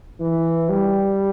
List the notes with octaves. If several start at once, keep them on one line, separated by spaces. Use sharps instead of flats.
E3
G3